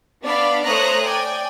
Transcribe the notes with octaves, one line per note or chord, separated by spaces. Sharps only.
B3 D4 D5 F5 B5
A3 C5 C#5 A#5 D#6 F#6
D5 G5 G#5